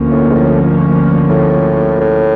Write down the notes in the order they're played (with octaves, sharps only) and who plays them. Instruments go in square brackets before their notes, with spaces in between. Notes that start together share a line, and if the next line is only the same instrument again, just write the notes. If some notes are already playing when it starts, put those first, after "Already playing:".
Already playing: [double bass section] D2 D3 F3 A#3 C#4
[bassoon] A2
G#2
A2
A2
A2